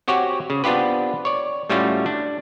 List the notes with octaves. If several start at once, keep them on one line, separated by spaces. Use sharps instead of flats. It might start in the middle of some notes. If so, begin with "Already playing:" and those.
C4 F#4 G4 C#5 F#5 G#5
C#3
B3 C4 D4 F4 G4 B4
C#5 D5
A2 G3 A3 C#4 F4 F#4
D4